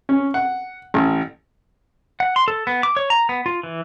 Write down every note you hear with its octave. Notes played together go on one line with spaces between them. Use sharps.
C#4
F#5
A1
F#5
C6
A4
B3
D6
C#5
A#5
B3
F4
E3